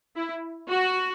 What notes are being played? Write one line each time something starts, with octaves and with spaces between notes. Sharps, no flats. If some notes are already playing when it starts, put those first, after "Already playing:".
E4
F#4